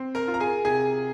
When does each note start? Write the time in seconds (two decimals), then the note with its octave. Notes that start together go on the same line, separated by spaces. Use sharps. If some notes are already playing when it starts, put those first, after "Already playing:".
Already playing: C4
0.15 A#4 A#5
0.28 F4
0.34 A#5
0.40 G#4 G#5
0.65 C3 G#4 G#5